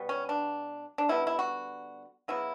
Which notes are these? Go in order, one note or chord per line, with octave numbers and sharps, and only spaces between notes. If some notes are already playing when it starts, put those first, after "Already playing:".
Already playing: B2 G3 B3
C#4
D4
D4
D3 G3 B3 E4
E4
F#4
C#3 F#3 B3 E4